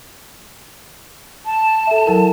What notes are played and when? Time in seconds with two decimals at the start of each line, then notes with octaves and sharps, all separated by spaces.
1.46 A5
1.87 A4 E5
2.06 F#3 E4 A#4